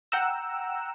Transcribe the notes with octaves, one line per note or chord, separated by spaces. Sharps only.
F#5 G5 A#5 E6